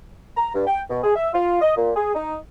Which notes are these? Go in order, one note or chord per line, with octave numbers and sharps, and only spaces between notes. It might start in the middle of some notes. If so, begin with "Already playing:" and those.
A#5
G2
G5
B2
G#4
E5
F4
D#5
A#2
G#4
D#4